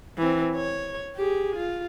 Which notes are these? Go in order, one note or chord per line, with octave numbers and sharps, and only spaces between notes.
E3 C4
C#5
G4 G#4
F4